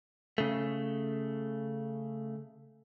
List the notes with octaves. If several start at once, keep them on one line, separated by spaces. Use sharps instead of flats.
C#3 A3